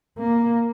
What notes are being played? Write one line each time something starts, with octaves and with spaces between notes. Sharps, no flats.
A#3